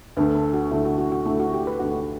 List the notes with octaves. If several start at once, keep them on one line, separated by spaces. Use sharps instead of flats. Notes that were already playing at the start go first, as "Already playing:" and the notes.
D2 D3 A3 B4
A4
F#4
D2 D3 A3 E4
F#4
F#4
F#4
D2 D3 A3 E4
F#4
G4
B4
D2 D3 A3 F#4 F#5